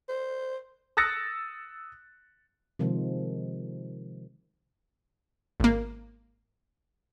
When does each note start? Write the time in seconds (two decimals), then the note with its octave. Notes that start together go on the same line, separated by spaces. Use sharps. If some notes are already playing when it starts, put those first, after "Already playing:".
0.09 C5
0.97 D#6 E6 F#6 A6 A#6 C#7
2.79 C3 D#3 F3 G#3
5.60 G#1 A#3